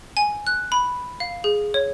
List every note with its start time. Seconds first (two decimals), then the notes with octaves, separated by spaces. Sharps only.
0.17 G#5
0.47 F#6
0.72 B5
1.20 F5
1.44 G#4
1.74 C#5